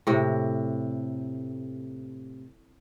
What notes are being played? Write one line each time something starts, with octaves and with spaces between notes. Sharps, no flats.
A2 C3